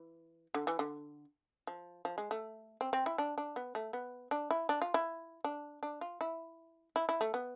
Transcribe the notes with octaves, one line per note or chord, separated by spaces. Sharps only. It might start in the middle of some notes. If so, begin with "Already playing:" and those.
Already playing: E3
D3
E3
D3
F3
F3
G#3
A3
C4
C4
E4
D4
D4
B3
A3
B3
D4
E4
D4
F4
E4
D4
D4
F4
E4
E4
E4
A3
B3